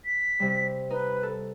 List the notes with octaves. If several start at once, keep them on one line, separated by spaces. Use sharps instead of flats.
B6
C3 G3
D#4 B4
A4